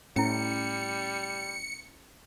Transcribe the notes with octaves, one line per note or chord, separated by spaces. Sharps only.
A2 G3 C#4 E4 C#7